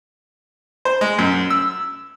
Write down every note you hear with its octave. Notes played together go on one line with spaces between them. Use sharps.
C5
G#3
F#2
E6